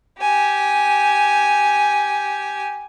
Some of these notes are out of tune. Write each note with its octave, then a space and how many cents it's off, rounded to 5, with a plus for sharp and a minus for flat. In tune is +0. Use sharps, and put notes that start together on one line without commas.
G4 -5 G#5 +0